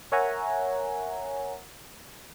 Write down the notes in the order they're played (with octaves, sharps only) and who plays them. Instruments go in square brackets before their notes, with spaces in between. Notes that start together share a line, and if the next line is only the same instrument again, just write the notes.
[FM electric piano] A#4 C#5 E5 F#5 G#5 A#5